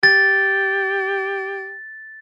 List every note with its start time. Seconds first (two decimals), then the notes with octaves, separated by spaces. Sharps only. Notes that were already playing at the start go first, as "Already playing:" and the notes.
0.03 G4 A6